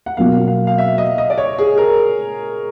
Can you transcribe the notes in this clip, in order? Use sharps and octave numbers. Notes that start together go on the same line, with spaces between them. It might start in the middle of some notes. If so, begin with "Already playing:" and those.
F#5
B2 F#3 A#3 F5
F5
F5
E5
D#5
D#5
D5
C#5
G#4
A#4